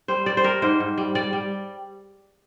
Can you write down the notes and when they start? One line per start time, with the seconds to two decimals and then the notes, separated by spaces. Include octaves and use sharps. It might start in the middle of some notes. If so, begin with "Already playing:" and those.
0.08 G3 C5
0.26 G3 D5
0.37 C5
0.44 G3 A#4
0.62 G#2 C5
0.80 G#2
0.98 G3
1.15 G3 D5
1.33 G3